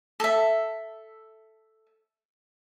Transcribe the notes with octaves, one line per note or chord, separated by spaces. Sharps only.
A4 E5